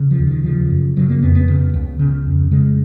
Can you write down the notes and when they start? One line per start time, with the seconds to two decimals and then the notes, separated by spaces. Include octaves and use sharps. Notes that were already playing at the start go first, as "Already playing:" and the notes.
Already playing: C#3
0.11 F3
0.19 D#2
0.27 D#3
0.44 C#3 F3
0.70 F#2
0.96 C#3 F#3
1.10 A#3
1.22 F2 B3
1.35 B3
1.48 C#3
1.74 C#2
1.99 C#3
2.26 F2
2.51 C#3 G#3